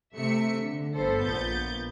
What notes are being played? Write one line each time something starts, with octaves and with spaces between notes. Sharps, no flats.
C3 A3 E5 C#7
D3
G1 B3 A4 C5
A#1 A#2 B3 G6 A6